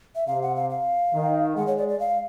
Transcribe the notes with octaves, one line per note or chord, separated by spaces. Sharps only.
E5
C3 F5
F#5
F5
F5
D#3
G#3 F#5
C#5
D5
D5
F5